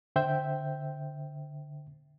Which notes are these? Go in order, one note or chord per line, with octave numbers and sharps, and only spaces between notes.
D3 C5 E5 G5 G6